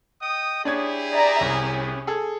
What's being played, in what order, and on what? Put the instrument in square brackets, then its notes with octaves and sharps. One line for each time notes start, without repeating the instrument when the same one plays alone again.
[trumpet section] D#5 G5 D#6
[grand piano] D4 C#5 G#6 [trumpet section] E4 G4 G#4
[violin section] D5 E5 A#5
[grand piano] C2 [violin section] C#4
[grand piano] G#4 A4